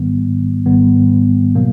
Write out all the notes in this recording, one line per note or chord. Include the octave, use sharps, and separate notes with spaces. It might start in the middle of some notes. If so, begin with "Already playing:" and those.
Already playing: G#1 G#2 D#3 G3 B3
G#1 G#2 D#3 G3 B3
B2 F#3 A#3